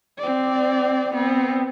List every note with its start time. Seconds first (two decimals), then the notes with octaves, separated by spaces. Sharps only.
0.19 C4 D5
1.14 B3 C4